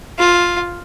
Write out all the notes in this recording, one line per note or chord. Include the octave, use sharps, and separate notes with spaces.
F4